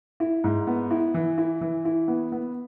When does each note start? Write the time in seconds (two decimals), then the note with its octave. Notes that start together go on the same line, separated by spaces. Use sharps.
0.20 E4
0.44 G#2
0.67 B3
0.91 E4
1.14 E3
1.38 E4
1.61 E3
1.85 E4
2.08 B3
2.32 B3